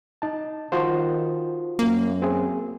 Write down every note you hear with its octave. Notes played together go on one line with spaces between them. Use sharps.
D#4 A5
D#3 F4 F#4 C5
F#2 A#3
C4 G#4